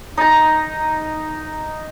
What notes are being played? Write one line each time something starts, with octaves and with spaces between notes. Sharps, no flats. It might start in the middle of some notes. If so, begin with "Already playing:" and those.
D#4 A#5